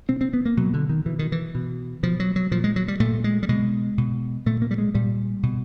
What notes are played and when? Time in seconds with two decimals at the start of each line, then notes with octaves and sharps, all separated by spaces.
0.09 B2 C4
0.21 C4
0.33 B3
0.45 A#3
0.57 B2 F#3
0.74 D3
0.89 D#3
1.06 B2 E3
1.19 D#3
1.32 E3
1.55 B2
2.03 B2 F3
2.20 F#3
2.36 F#3
2.51 A#2 F3
2.64 G#3
2.76 F#3
2.88 G3
3.00 A#2 A3
3.24 G#3
3.43 G3
3.49 B2 G#3
3.98 B2
4.46 A#2 A3
4.62 A#3
4.71 G3
4.78 G#3
4.95 A#2 G3
5.43 B2